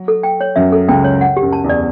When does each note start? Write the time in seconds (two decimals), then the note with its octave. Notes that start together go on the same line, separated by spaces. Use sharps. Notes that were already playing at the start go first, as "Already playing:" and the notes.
Already playing: F#3
0.08 A4
0.23 G5
0.41 C#5
0.56 F#2 F#3 E5
0.72 A4
0.88 C#2 C#3 G5
1.04 C#5
1.21 F#5
1.37 G4
1.42 F#2
1.53 A5
1.64 E2
1.69 D5